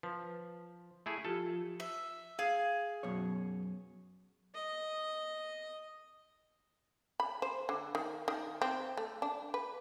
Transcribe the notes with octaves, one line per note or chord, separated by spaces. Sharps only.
F3 B4
A3 E4 G#4
F3 F4 G4 A4
E5
G#4 F5
F#2 B2 C#5
D#5
B5
C5
D3
D#3
D#3
C4
A3
D4
B4